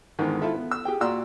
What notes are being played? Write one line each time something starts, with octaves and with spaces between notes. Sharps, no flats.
E2 G#2 D3 D#3
E4 F4 A4 E5
B3
E6
G4 G#4 G5
A#2 F#4 D5 A#5 C6 E6